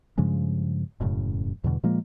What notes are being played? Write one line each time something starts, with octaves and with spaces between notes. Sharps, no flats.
G2 C#3 F3 G#3
E1 F#2 A2 C#3
E2 G2 B2 D3
A#2 F3 G#3 A#3